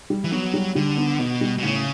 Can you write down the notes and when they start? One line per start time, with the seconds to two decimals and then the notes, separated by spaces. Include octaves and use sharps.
0.10 G3
0.24 E3
0.32 F#3 B3
0.54 G3
0.75 D3 G3
0.97 B3
1.19 B2 B3
1.41 G3
1.58 B2
1.63 A2 C#3